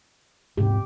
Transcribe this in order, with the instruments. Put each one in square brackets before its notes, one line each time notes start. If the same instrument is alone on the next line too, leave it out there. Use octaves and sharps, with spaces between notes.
[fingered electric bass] D#1 G#2 C3 [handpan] G4